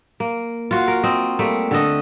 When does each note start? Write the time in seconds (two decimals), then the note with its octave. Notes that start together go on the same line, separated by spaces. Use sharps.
0.20 A#3
0.71 F4 F#4
0.88 A#4
1.03 C4 D#5
1.39 G3 A3 A#3
1.71 D3 A4 D#5